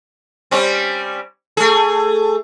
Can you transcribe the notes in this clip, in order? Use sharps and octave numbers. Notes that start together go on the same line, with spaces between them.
G3 C4 C#4
A3 G#4